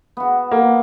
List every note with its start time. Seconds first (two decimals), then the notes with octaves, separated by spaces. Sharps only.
0.17 B3 F#4
0.51 A#3